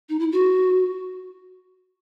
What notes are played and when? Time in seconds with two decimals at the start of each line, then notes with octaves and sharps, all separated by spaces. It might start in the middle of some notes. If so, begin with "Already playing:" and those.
0.09 D#4
0.19 E4
0.32 F#4